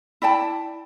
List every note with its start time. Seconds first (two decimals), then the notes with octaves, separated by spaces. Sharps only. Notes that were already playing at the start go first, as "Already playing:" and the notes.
0.22 E4 D5 G5 A5